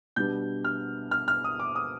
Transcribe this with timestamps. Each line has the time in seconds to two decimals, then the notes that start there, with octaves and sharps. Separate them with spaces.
0.16 B2 G3 B3 D4 G6
0.64 F6
1.11 F6
1.28 F6
1.44 D#6
1.59 D6
1.75 D#6